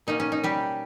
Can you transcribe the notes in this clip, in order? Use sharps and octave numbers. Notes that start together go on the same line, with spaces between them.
B2 A#3 C#4 D#4
C#4
D#4
G3 G4